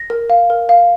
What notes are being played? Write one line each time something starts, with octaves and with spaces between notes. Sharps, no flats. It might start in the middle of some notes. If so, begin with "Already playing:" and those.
Already playing: A#6
A#4
F5
A#4
F5